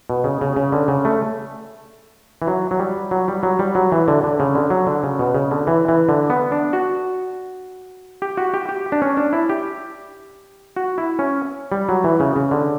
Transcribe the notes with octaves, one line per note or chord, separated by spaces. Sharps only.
B2
C#3
C#3
C#3
D3
C#3
A3
E3
F#3
F#3
G3
F#3
G3
F#3
G3
F#3
E3
D3
D3
C#3
D3
F#3
D3
C#3
B2
C#3
D3
E3
E3
D3
B3
D4
F#4
G4
F#4
G4
G4
D4
C#4
D4
E4
G4
F#4
E4
C#4
G3
F#3
E3
C#3
C#3
D3